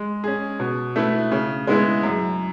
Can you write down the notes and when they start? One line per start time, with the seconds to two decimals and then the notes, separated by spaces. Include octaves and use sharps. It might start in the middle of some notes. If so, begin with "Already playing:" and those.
Already playing: G#3
0.24 C#4 G#4
0.60 B2
0.96 A3 E4 B4
1.32 C#3
1.67 G#3 B3 E4 G#4
2.03 F#2